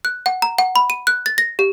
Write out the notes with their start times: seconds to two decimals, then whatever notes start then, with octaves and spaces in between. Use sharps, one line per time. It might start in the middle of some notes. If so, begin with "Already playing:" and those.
0.05 F#6
0.26 F#5
0.42 A#5
0.58 F#5
0.76 B5
0.90 D#7
1.07 F#6
1.26 A6
1.38 A#6
1.59 G4